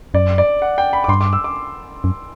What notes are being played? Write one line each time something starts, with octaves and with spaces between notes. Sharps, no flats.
F#2 D5
D5
F#5
G5
B5
D6
G2 C6
D6
E6
D6
F#2